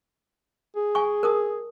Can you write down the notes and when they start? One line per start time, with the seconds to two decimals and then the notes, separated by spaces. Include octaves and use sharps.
0.76 G#4
0.95 G#5 C#6
1.23 A#4 A5 D#6